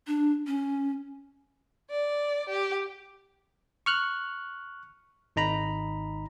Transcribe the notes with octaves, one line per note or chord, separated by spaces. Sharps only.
D4
C#4
D5
G4
C#6 F6 F#6
G#1 D#4 A#5 B5